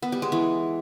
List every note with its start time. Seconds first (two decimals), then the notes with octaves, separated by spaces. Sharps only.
0.02 B3
0.12 G3
0.22 G#3
0.32 E3